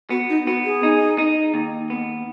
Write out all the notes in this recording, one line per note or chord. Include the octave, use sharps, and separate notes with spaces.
B3 F#4
D#4
B3 F#4
G#4
D#4
D#4
D#2
B3